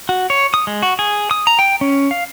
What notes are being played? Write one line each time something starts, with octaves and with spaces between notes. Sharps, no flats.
F#4
C#5
D#6
G#3
F#4
G#4
D#6
A#5
G5
C#4
F5